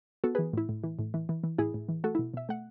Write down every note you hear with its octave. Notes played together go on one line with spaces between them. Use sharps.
B3 F#4 A4
E3 G#4 B4
A2 E4
A2
E3
A2
E3
E3
E3
A2 E4 G#4
A2
E3
A3 F#4 A4
B2 E4
B2 E5
A3 F#5